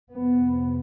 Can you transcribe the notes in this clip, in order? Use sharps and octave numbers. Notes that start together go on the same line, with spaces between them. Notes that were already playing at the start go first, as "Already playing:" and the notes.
F2 C3 B3